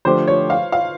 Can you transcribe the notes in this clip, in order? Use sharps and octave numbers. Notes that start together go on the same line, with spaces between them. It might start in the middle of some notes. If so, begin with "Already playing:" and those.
D3 F3 A3 D4 G4 C5
C#5
F5
F5